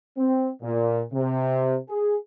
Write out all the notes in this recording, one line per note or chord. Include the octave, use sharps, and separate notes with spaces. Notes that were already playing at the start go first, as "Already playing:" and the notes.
C4
A#2
C3
G#4